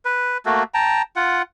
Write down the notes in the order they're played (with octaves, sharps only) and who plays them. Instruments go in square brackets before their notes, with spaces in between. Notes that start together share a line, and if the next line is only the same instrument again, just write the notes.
[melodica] B4
A3 A#3 F#4
G5 A5 A#5
F4 F#5